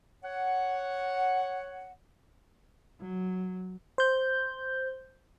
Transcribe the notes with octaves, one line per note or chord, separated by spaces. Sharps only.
C#5 F#5
F#3
C5 G6